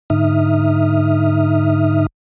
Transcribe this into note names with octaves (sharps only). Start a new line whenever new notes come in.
G#2 D3 D#4 E5 D#6 F6